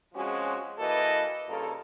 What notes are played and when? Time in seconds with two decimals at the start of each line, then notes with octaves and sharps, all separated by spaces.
0.14 F3 G#3 C4 C#4 F#4
0.78 E3 A#3 F#4 A4 B4 D#5
1.48 G2 C#3 A#3 F4 A4